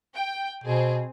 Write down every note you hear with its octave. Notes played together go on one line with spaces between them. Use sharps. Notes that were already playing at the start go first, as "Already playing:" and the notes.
G5
B2 C4 G#4